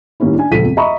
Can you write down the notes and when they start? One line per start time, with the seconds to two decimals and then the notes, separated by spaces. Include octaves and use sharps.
0.20 A2 D#3 G3 A#3 C#4 E4
0.35 D4 G#5
0.51 D#1 C#2 F3 A4 B6 D#7
0.65 F2
0.77 D#5 E5 A#5 B5 C#6